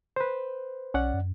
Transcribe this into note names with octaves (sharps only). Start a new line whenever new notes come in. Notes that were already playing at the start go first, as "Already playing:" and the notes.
B4 C5
B1 C#4 D5 F#5
F#2